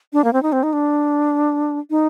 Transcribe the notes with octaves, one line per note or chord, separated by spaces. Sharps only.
D4
A#3
C4
D#4
C4
D#4
D4
D#4